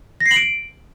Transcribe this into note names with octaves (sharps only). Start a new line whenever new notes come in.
A#6
C7
F#7
D7